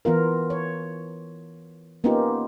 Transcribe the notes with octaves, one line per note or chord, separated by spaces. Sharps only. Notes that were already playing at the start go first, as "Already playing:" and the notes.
E3 B3 F4 A#4
C#5
A#3 B3 C#4 D#4 F4 G4